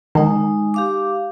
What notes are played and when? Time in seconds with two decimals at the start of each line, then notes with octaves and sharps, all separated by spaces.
0.15 D#3 G#3 D#4
0.74 G4 F5 D6